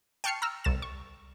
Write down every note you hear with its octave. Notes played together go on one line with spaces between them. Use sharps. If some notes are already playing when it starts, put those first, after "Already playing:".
G5 A5 C#6 F6 C7 C#7
A#5 E6 F6
C2 A6 E7
C#6